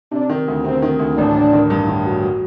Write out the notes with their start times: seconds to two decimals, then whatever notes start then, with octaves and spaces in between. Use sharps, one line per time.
0.11 C3 D4
0.29 D#3
0.48 D2
0.64 C3 C4
0.82 D#3
0.99 D2
1.17 A1 D4
1.34 A1
1.53 D#3
1.70 G2
1.88 D#3
2.06 F#3
2.23 F#3